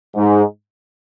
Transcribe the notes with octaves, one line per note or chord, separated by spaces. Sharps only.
G#2